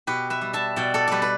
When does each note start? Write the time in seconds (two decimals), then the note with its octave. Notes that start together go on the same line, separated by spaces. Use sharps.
0.07 B2 G4 B4
0.30 B4 E5
0.41 G3
0.53 E5 A5
0.76 B2 D5 G5
0.94 A4 D5
1.08 G3 G4 B4 D5
1.22 B4